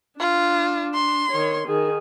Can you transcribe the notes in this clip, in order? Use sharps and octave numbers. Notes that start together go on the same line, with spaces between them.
D4 F4
C6
D#3 C#5
D#3 G#4